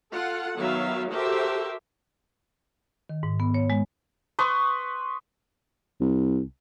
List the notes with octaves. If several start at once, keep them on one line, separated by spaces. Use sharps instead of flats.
F4 A4 F#5
D#3 F#3 B3 E5 F5
F#4 G4 A4 A#4 C5 E5
D#3
G#2
B3
C#5
G#3
B4 C6 C#6 D#6
C2